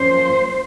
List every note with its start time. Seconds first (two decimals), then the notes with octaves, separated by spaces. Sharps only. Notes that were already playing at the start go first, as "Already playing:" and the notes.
Already playing: F3 A#3 C#4 C5